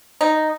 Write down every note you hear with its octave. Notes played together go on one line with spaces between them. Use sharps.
D#4